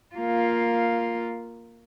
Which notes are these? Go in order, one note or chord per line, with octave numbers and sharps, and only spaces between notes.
A#3 F4